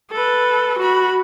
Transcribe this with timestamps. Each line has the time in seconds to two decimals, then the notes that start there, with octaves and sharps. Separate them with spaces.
0.11 A4 B4
0.78 F#4 B5